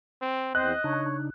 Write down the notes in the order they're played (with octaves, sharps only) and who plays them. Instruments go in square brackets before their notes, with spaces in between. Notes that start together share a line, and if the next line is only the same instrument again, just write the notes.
[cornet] C4
[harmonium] E2 C4 C5 [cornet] D#5 [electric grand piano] F#6
[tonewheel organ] C#3 D4 D#4 [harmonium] C#5